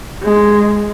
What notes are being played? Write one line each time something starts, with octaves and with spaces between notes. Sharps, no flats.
G#3